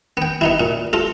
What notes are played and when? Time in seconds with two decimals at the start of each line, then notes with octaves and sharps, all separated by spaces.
0.17 B3 G5
0.41 B3 D#4 E4
0.60 A#2
0.93 F4 A4